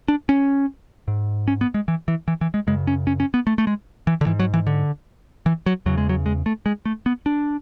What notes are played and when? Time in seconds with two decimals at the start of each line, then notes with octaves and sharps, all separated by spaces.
0.08 D4
0.29 C#4
1.08 G#2
1.48 C#4
1.61 B3
1.74 G#3
1.88 E3
2.08 E3
2.28 E3
2.41 E3
2.54 G#3
2.67 F#2 C#3 G#3
2.87 C#4
3.07 C#4
3.20 C#4
3.34 B3
3.47 A3
3.58 A3
3.67 G#3
4.07 E3
4.21 D3
4.26 G#2 E3
4.40 F#3
4.54 E3
4.67 D3
5.46 E3
5.66 F#3
5.86 E2 C#3 F#3
5.98 G#3
6.09 F#3
6.26 G#3
6.46 A3
6.66 G#3
6.86 A3
7.06 B3
7.26 D4